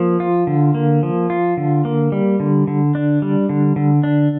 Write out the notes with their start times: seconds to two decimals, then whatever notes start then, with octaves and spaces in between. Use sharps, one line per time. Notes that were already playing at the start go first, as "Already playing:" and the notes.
Already playing: F3 A#3
0.20 F4
0.47 D3
0.74 A#3
1.03 F3
1.30 F4
1.57 D3
1.85 A#3
2.12 G3
2.40 D3
2.67 D3
2.95 D4
3.22 G3
3.49 D3
3.76 D3
4.03 D4